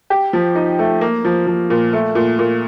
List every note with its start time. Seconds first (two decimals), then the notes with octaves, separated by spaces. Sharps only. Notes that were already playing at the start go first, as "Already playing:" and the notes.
0.10 G4
0.33 F3
0.55 D#4
0.79 A3
1.01 A#3
1.25 F3
1.47 F3
1.70 A#2
1.93 A3
2.15 A#2
2.39 A#2